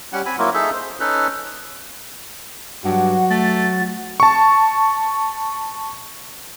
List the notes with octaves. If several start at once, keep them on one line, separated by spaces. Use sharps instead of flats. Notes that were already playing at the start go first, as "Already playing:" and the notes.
G3 C#4 F#5
C4 G#5 B5
F#3 A#3 E4 F4
D#4 G#4 A4 E5
C5
C#4 D#4 A4 B4
G2 F#3 F#4 F#5
A3 A6
A5 C#6